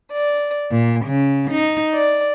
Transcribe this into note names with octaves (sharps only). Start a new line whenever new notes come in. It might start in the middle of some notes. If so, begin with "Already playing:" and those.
D5
A#2
C#3
D#4
D5